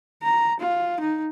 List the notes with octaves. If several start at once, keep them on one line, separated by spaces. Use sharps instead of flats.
A#5
F4
D#4